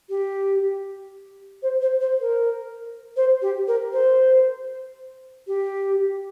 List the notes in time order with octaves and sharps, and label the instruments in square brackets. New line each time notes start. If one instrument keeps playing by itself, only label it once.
[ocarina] G4
C5
C5
C5
A#4
C5
G4
A#4
C5
G4